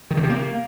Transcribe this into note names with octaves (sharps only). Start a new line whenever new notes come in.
D#3
D3
C3
A#3